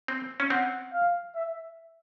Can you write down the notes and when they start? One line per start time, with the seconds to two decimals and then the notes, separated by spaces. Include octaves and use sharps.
0.08 C4
0.40 C#4
0.50 C4 F#5
0.92 F5
1.35 E5